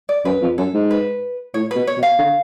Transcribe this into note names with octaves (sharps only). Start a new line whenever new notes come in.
D5
F#2 B4
F2
F#2 A4
G#2
B4
A2 C#5
B4
B2
C#5
B2
F5
D3